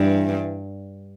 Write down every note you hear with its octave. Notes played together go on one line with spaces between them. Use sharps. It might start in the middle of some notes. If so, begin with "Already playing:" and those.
Already playing: G2 E3